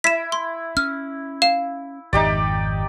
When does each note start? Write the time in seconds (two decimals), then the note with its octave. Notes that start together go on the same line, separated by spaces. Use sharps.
0.04 E4 B6 E7
0.32 C6
0.77 C#4 F6
1.42 F5 E7
2.13 G#1 F2 D#4 G4 D5